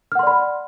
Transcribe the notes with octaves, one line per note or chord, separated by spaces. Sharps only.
D5 F#5 B5 C6 F6